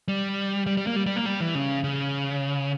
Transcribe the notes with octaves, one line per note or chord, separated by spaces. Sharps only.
G3
G3
G3
A#3
G3
G3
A#3
G3
E3
C#3
C#3